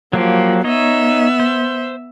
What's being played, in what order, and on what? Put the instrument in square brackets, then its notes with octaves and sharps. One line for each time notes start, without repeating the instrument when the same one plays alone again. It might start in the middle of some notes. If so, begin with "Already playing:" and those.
[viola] F3 [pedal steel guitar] F#3 A#3 G4
[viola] B3 E5 [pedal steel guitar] D#4 C#5 D#5
[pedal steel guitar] C5